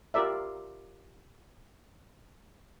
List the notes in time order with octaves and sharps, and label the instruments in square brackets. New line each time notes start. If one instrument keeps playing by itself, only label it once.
[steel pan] F4 G4 A#4 D5 E5